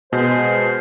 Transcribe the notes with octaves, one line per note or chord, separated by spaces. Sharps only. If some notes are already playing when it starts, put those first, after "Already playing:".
B2 G#3 C5